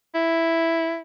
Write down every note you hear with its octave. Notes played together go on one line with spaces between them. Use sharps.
E4